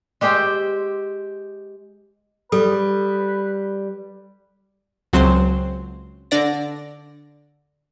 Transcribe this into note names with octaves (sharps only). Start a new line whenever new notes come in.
G#3 G4 C5 E5 G5
G3 A4 B4
C#2 F#3 C4 C5 C6
D3 D5 A#6